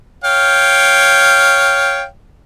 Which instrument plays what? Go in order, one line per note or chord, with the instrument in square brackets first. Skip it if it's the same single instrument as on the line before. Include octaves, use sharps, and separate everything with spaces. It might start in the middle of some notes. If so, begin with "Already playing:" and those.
[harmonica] C#5 F5 G5